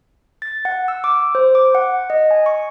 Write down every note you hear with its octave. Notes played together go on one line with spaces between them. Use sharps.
A6
F#5
E6
D6
C5
D6
F#5
D#5
G#5
C#6